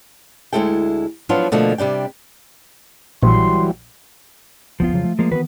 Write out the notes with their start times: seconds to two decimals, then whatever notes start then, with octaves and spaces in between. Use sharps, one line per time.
0.53 D2 B2 G#3 E4 A4 G5
1.29 F3 F#3 B3 D4 F4 F#4
1.52 B2 D3 F3 A3 A#3
1.78 C3 G3 D4 G5
3.22 A#1 E3 F#3 G3 C6
4.80 E1 C#2 F3 B3 F4
4.92 F2 C#3 F#3
5.04 A3
5.19 F3 G#3 A#3
5.31 D#3 E3 B3 F#4 B4